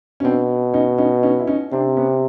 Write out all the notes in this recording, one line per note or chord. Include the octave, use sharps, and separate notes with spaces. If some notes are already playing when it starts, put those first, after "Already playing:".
C#4
B2 C4 D4
C#4 D#4
C#4 D#4
C#4 D#4
E4
C#4 D#4
C3 C4 D4
B3 C#4